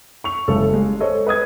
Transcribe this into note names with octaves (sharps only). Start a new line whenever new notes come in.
C#6 F7
F#1 C#3 G#3 A4
G3 G#3
A4 C5 C#5 D#5
B4 D#5 D#6 G#6